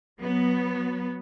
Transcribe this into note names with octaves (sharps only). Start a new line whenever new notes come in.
F#3 B3